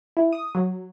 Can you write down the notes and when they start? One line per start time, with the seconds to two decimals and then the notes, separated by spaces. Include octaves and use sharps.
0.17 E4
0.33 D#6
0.55 F#3